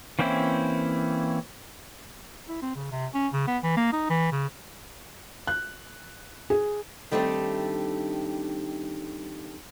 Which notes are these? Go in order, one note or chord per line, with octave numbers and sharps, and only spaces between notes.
E3 A#3 C4 C#4 E4
E4
C4
C#3
C3
C#4
C#3
B3
E3
A#3
D#4
E3
C#3
F#6
G#4
D#3 G3 A3 C4 D4 G4